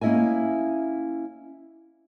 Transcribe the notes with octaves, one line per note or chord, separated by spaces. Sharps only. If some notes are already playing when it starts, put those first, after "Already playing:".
A#3 C#4 E4 D#5 E5 G#5